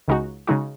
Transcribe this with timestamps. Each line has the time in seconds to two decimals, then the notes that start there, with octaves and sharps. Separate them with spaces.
0.08 C#2 C#3 G#3 D#4 F#4
0.47 C#3 G#3 D#4 F#4